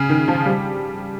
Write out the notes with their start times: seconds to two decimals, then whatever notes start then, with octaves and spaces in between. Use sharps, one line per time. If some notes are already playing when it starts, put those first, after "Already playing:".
Already playing: C#3
0.09 D#3
0.28 F3
0.45 G3